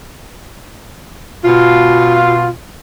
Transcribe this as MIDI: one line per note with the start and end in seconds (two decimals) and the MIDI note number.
1.45 2.49 47
1.45 2.49 65